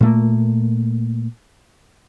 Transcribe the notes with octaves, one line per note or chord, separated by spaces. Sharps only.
A#2 A3 A#3